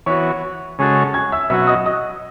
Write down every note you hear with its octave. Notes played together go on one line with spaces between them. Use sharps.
E3 B3 F#4 C#5 C#6
C#3 G#3 C#4 F#4 A4
G#5 G#6
E5 E6
B2 F#3 C#4 F#4 E5 E6
D#5 D#6
D#5 D#6